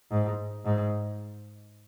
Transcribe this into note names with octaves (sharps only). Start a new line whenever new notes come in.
G#2
G#2